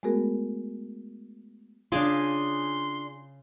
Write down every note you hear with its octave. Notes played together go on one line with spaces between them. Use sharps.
G#3 A3 B3 F#4 G#4 A#4
C#3 D4 F4 G#4 C6 D6